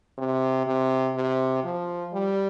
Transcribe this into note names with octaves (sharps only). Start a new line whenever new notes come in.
C3
C3
C3
F3
G3